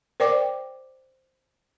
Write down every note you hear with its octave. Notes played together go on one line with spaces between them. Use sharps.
A#4 C5 D5 G5 D6